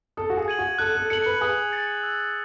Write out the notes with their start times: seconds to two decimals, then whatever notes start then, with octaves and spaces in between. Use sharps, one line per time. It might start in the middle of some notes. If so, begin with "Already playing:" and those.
0.17 A4 D#6
0.30 F#4
0.37 G#4
0.48 G#6 D#7 F#7
0.59 F#4
0.79 A4 F#6
0.95 A4
1.10 A4 C#7 F#7
1.26 B4
1.41 G#4 D#6
1.72 A6 C#7
2.03 E6